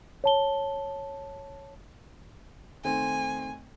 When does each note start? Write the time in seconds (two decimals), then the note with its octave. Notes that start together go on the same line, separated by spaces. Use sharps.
0.24 C#5 A5 G7
2.85 D#3 A3 C4 G#5